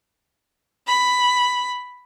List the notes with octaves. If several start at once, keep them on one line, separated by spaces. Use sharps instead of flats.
B5